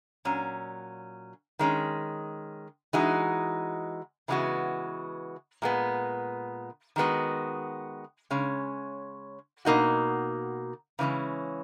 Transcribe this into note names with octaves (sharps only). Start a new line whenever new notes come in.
A#2 F#3 C#4
D#3 G#3 C#4
E3 G#3 D#4 F#4
C#3 E3 G#3 B3 F#4
A#2 G#3 B3
D#3 G#3 B3 F#4
C#3 G#3 C#4
B2 A#3 D#4 F#4
C#3 E3 G#3 C#4